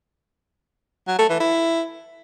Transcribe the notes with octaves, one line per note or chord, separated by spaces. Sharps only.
F#3
A3
E3
E4